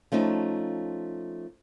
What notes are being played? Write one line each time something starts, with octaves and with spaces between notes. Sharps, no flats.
F3 A3 C#4 D#4